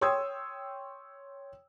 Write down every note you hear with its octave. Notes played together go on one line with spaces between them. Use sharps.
C#5 G5 C6 D#6 E6 G#6